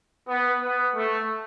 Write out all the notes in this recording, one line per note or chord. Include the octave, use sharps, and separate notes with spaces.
B3
B3
A3